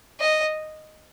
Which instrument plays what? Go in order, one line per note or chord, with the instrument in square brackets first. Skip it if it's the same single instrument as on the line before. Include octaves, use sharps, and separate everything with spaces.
[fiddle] D#5